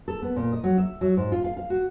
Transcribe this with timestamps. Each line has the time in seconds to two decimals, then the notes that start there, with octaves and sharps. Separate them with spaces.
0.08 A4
0.22 B3
0.36 A#2
0.52 D#5
0.63 F#3
0.78 E5
1.01 F#3
1.17 G#2
1.32 F4
1.44 F5
1.57 F5
1.70 F#4